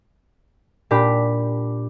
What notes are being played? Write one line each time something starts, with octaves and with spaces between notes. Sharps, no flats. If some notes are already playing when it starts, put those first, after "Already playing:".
A#2 D4 G4 B5